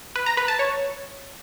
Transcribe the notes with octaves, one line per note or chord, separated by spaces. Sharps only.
B4
A#5
B4
A5
C#5